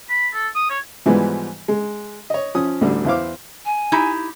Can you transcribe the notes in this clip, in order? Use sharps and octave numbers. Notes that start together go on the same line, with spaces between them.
B5
A4
D#6
C#5
G#2 E3 F3 G3 G#3 B3
G#3
C#5 D#5
F3 C#4 D#6
A1 D2 D3 G3
E2 E4 C5 F5 D6
G#5
D#4 E4 G4